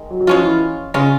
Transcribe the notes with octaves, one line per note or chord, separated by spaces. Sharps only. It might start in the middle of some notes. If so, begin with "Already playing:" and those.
Already playing: D#3 G#3
F#3
F#3
F3 G#3 C#4 F4
E3
C#3 G#3 C#4 F4